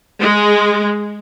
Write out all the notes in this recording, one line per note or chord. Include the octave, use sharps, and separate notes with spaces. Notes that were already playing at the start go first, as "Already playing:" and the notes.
G#3